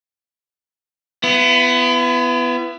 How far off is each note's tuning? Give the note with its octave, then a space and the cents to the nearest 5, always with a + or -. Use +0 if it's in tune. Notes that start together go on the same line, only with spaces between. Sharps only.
B3 +15 E4 +40